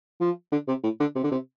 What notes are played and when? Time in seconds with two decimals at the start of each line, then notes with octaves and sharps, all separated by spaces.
0.20 F3
0.52 D3
0.68 C3
0.83 A2
1.00 D3
1.15 C3
1.23 D3
1.32 C3